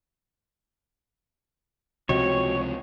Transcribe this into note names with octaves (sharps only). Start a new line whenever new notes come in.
C#2 C3 F3 F#4 C#5 D#5 G5